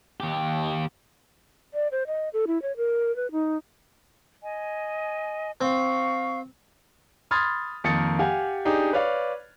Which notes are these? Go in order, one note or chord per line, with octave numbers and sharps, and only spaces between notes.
D#2 G4
D5
C5
D#5
A4
E4
C#5
A#4
B4
D#4
D#5 G#5
C4 F5 C#6
B5 C6 D#6 F6 G#6 A6
F2 D#3 A#3 D#6 A6 C#7
G4 F5 F#5 G#5
D4 D#4 G4 G#4
B4 C#5 D5 F5